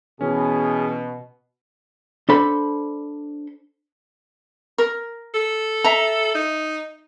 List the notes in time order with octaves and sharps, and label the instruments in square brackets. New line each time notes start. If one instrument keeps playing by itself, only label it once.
[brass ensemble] B2 [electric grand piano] E3 C#4 [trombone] G#4
[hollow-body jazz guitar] D4 A4 C5 B5 C6
[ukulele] A#4
[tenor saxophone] A4
[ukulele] E5 A#5
[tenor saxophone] D#4